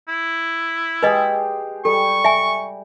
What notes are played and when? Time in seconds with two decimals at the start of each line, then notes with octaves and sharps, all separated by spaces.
0.08 E4
1.03 G#3 G4 G#4 B4 D#5
1.85 G3 A4 C#6
2.25 E5 G#5